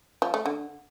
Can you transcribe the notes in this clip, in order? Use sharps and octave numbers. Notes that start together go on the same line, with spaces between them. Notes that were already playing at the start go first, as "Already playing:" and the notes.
F3
A3
D3